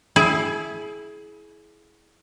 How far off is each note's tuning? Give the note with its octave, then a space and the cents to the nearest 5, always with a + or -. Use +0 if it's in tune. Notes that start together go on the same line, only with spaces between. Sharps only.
E4 +0 G#4 +25